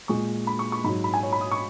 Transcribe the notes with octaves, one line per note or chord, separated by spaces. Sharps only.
A#2 G#3 C#6
B5
C#6
C#6
G#2 F#3 B5
B5
G#5
C#5
B5
D#6
C#6